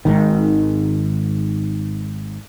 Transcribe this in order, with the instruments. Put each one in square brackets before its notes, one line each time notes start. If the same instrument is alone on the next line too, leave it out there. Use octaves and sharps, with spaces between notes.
[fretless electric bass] G#1 G#2 D#3